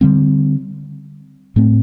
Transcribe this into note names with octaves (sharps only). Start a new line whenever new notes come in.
D3 G3 C4
A2 A3 C4